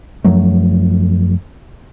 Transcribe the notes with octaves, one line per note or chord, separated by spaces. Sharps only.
F#2 F3 F#3 A3